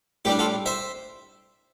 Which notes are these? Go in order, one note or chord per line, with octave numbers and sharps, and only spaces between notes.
A2 G3 D4 G4
F4 A4
C5 E5